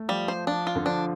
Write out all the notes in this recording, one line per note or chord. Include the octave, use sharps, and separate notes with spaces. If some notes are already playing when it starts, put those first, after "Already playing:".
Already playing: A3
F3 G3
C5
F3 D4
F4
D3
F3 D4